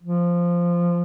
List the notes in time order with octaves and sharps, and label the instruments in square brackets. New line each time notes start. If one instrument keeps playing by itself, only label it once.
[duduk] F3